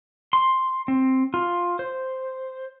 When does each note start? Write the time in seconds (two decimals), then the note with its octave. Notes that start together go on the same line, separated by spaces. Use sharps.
0.33 C6
0.88 C4
1.34 F4
1.79 C5